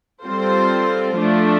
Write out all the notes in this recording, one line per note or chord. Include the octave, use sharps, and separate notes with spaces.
G3 C4 F4 A4 C5
F3 A3 D4 F4